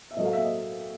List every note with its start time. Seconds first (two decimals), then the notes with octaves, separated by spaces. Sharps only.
0.11 E5
0.16 A2 F#3 A3 D#5
0.25 F5
0.33 E5
0.42 D#5